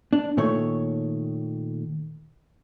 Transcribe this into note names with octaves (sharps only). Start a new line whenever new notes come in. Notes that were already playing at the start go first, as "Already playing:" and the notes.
D4
A#2 D#3 A3 C#5